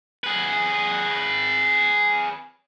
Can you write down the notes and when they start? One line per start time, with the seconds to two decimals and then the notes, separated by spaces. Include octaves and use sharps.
0.24 G#4 B4